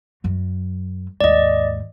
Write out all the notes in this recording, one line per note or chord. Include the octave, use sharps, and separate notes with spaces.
F#2 F#3
D#2 G#2 D5 D#5